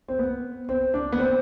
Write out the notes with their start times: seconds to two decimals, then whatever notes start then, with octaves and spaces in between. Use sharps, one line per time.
0.08 C4
0.19 B3
0.69 C4
0.94 D4
1.12 B3
1.19 C4